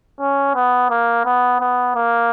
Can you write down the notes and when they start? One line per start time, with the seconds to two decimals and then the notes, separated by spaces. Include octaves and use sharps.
0.20 C#4
0.55 B3
0.90 A#3
1.25 B3
1.60 B3
1.96 A#3